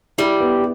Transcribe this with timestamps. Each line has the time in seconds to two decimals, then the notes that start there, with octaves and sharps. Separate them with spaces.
0.18 G3 E4
0.40 B3